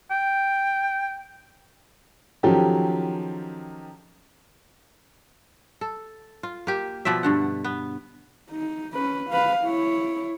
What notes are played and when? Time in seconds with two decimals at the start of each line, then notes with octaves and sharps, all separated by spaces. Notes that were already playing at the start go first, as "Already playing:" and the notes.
0.11 G5
2.43 D#3 F3 F#3 C#4 G4 A4
5.81 A4
6.43 F4
6.67 A#3 G4
7.05 B2 F3 D5 E5
7.23 G2 D3 F#5
7.64 B3
8.51 D#4
8.94 C#4 B4
9.30 B4 F5
9.64 E4 C#5